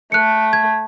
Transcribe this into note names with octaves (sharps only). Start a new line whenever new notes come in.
A3 F#6 C#7
G#6